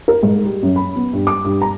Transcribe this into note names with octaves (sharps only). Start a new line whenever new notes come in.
A#4
G#2
G3
F#2
B5
B3
G2
D6
G2
A#5